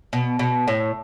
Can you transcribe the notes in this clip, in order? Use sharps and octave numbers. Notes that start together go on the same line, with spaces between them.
B2
B2
A2